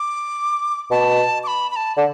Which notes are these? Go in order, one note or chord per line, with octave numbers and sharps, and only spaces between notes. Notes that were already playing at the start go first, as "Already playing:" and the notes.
Already playing: D6
B2 A5
D6
B5
B5
A5
D3 A5